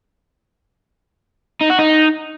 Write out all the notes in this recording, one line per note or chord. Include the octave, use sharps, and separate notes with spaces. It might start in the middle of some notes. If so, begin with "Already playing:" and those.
D#4
F#4
D#4